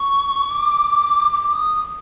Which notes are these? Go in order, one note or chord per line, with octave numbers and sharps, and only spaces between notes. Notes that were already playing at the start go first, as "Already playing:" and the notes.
Already playing: C#6
D6
D6
D#6